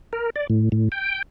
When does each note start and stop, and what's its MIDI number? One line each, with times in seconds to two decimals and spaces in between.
0.13 0.30 70
0.36 0.47 74
0.50 0.69 45
0.72 0.89 45
0.92 1.22 79